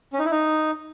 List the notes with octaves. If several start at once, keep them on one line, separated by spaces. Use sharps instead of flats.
C#4
D#4
E4
D#4